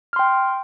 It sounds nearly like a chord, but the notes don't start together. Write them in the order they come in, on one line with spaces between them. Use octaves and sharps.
F6 C6 G5